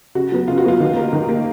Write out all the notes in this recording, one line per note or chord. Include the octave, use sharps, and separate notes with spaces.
C#3 F#4
F#3 B3
C#3 F4
F#4
F#3 B3 F4
D#3
A#3
D#3
A#3